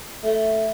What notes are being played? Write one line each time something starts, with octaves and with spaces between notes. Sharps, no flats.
A3